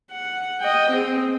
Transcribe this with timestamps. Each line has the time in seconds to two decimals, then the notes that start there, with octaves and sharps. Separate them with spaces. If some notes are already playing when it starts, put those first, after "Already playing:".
0.12 F#5
0.61 D#5 G5
0.92 C4 G#4